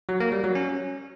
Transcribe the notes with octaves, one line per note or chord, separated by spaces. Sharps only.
F#3
A#3
G3
F#3
C#4